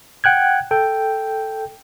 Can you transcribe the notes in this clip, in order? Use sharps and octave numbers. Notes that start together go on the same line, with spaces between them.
F#5 G5 F#6 G#6
A4 G5